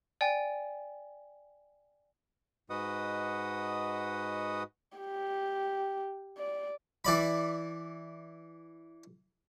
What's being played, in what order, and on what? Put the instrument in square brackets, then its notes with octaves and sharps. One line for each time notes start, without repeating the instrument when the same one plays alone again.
[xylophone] D5 G5 G#5
[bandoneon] G#2 F#4 B4 D#5 F#5 D#6
[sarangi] G4
D5
[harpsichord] E3 D5 B5